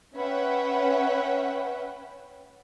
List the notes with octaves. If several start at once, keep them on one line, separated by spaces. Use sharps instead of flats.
C#4 B4 C#5 E5 F#5 G5